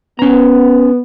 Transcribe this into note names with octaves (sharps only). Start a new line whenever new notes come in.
B3 C#4 A#5